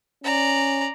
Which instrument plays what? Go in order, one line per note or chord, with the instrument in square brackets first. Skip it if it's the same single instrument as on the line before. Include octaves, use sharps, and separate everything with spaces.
[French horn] C#4 [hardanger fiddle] D5 A#5